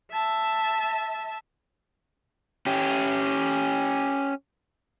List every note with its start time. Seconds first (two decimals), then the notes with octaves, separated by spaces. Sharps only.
0.12 E5 A5
2.66 C#4 G4